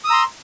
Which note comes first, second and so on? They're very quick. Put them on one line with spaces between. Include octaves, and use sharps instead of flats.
D#6 E6 A#5 C6